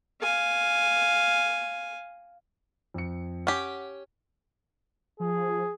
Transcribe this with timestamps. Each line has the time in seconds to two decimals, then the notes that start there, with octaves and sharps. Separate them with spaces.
0.22 F5 G#5
2.94 F2 C#7
3.47 C#4 G4 F#5
5.20 F3 G#4